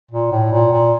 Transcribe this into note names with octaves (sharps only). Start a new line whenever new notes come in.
A#2
A2
A#2
A#2